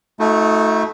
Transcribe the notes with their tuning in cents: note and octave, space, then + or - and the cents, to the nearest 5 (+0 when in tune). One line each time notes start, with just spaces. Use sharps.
A3 +0 D#4 +30 F#4 -40